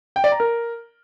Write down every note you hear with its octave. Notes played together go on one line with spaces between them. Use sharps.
G5
D5
A#5
A#4